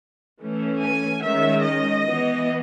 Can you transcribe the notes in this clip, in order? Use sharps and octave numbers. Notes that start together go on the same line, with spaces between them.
E3 A3 C#4
G#5
D#3 G#3 C#4 E5
D#5
E3 B3